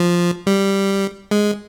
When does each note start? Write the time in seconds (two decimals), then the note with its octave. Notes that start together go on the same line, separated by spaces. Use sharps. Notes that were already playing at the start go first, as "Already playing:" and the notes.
Already playing: F3
0.47 G3
1.31 G#3